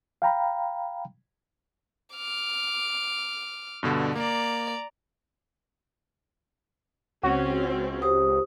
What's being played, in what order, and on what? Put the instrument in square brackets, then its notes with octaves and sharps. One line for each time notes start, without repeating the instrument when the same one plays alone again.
[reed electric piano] F5 G5 A#5 B5
[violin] D6 F6
[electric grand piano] G2 B2 D3
[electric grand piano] A#3 [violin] D5 A#5
[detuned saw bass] C#2 [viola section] C4 C#4 [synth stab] F#4
[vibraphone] G4 C5 D#6